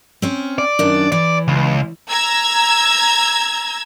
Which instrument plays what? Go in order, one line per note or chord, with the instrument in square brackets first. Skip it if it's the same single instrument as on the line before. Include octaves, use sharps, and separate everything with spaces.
[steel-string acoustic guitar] C4 C#4
[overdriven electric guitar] D5
[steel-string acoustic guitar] F#2 D#3 D4
[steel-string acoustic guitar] E3 [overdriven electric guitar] D5
[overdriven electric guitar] C#2
[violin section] A#5 E6 G#6